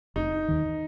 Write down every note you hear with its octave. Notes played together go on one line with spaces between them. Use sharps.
F1 D#4
D#2 D#3